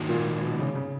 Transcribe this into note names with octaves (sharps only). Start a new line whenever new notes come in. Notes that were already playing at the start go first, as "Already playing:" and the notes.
Already playing: G#2 D#3 A#3 D#4 F#4
A#2
B2
C#3
C#3